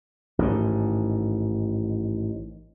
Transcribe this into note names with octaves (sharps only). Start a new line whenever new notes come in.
A1 G#2 C3 D#3